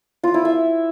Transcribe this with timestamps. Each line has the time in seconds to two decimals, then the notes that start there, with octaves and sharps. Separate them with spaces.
0.23 F4
0.34 E4
0.45 E5